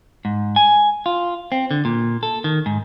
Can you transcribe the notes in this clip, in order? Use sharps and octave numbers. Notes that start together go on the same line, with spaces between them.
G#2
G#5
F4
C4
D3
A#2
A4
D#3
G#2